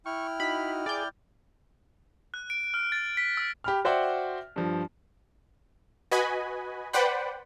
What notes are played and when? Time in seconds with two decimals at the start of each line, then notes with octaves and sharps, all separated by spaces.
0.06 E4 G5 C#6 F6
0.40 D#4 F#4 B5
0.86 G#4 D5 G6
2.34 F#6
2.50 D7
2.74 F6
2.92 A6
3.17 B6
3.37 E6
3.64 G4 B5 F6
3.85 F#4 C5 D5 E5 F#5 G5
4.56 G2 F3
6.11 F#4 B4 D#5 G#5 B5
6.93 B4 C5 D5 F#5 G5 B5